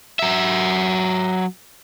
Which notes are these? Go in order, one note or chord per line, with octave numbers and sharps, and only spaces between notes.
F#3 E5